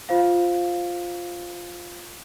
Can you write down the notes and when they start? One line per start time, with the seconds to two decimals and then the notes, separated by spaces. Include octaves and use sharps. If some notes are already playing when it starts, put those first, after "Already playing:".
0.09 F4 C5 F5